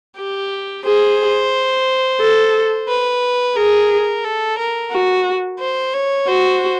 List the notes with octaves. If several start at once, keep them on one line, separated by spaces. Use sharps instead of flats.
G4
G#4 C5
A4
B4
G#4 A#4
A4
A#4
F#4
C5
C#5
F#4 C5